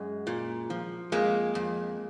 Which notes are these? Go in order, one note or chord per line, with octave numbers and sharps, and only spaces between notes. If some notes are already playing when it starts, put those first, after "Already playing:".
Already playing: F#2 G#3
A#2
F3
F2 G#3 A#3
F2